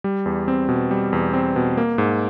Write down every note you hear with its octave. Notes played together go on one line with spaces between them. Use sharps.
G3
E2
C4
B2
G3
E2
C4
B2
A#3
G#2